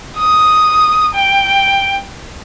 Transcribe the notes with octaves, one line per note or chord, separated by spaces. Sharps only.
D#6
G5